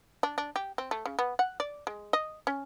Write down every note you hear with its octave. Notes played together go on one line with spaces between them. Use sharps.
D4
D4
G4
C4
A3
C#3
B3
F#5
D5
G#3
D#5
C#4